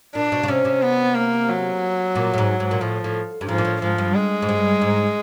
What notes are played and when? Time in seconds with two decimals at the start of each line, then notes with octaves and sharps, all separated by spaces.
0.15 A#2 D4
0.32 B2
0.43 C#3
0.48 C3 C#4
0.65 C3
0.82 B3
1.15 A#3
1.49 F#3
2.15 A#2
2.34 A2
2.38 G#2
2.60 G#2
2.71 A#2
2.81 A2 F3
3.04 A2
3.41 G2
3.49 G#2 F3
3.58 A#2
3.65 A2
3.82 G#2 F3
3.98 G2
4.15 G#3
4.42 G#2
4.49 G2
4.81 G#2